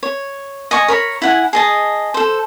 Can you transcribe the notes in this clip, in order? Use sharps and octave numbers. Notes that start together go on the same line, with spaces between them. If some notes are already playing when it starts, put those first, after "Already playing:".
C#5
D#5 G#5 C#6
A#4 C#5 B5
E4 F#5 G#5
G#4 D#5 A5
A4 C5